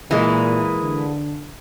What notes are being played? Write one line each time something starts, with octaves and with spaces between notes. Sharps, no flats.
A#2 E3 G#3 A#3
D3